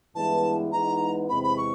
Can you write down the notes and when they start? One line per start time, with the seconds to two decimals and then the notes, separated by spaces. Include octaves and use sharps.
0.15 G2 E3 G#3 B3 E4 A5
0.71 G#2 E3 G#3 B3 D#4 A#5
1.28 E2 C3 E3 G#3 C4 B5
1.43 B5
1.57 C#6